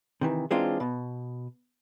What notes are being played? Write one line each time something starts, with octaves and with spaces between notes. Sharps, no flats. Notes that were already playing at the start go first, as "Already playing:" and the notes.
C3 D#3 E3
E3 G#3 C4 D4 D#4 F4
B2